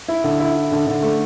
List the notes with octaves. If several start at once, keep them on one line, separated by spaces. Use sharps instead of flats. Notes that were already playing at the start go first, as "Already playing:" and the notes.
E4
D3
E4
E4
D3
D3
A3